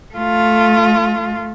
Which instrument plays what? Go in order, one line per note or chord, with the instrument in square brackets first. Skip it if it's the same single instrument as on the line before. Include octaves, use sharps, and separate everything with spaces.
[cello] A3 F4